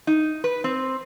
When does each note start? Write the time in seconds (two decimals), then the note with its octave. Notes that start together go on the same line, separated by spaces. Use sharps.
0.07 D#4
0.44 B4
0.64 C4